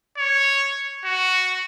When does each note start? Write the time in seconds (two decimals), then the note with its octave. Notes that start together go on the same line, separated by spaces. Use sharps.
0.18 C#5
1.05 F#4